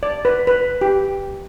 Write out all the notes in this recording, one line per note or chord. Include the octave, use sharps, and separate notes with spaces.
D5
B4
B4
G4